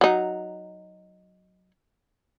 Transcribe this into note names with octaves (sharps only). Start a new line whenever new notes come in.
F#3 D#4